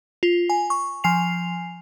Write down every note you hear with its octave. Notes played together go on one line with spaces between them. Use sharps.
F4
G#5
C#6
F3 G#5 C7 F7